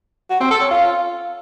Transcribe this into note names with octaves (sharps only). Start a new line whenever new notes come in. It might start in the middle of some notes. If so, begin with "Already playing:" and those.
F#4
C4
A4
C#4
F4